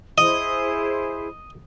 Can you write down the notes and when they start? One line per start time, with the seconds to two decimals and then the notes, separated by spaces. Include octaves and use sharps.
0.18 E4 G#4 C5 D#5